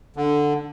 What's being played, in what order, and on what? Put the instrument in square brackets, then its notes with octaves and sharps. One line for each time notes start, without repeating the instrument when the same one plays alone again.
[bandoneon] D3